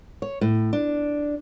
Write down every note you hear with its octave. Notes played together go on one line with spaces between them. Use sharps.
C#5
A2
D4